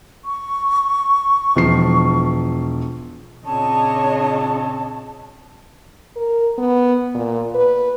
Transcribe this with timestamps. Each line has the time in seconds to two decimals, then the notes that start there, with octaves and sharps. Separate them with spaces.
0.25 C#6
1.55 E1 F3 C7
3.45 A#2 C#3 C4 D4 C#5 D#5 A5
6.16 A#4
6.58 B3
7.14 A#2
7.55 B4